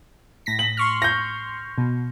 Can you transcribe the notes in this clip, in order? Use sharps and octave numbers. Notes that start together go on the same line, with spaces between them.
A2 A#6 B6
F#7
C6 C#6 F6
G6 A#6
B2